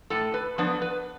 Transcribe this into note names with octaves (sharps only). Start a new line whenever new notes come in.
A2 A4
B4
F3 B3 D4 B4
B4